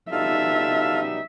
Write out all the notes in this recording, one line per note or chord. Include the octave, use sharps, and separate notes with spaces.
B2 G3 D#4 F4 A4 E5 F5